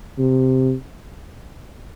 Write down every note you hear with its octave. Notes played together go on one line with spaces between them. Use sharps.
C3